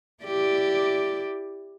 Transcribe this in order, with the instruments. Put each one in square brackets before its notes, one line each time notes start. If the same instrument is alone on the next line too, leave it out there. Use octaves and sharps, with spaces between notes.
[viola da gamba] E4 G4 D5